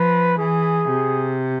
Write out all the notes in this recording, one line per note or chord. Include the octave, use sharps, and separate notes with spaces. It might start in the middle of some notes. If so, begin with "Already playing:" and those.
Already playing: F3 B4
E3 G#4
C3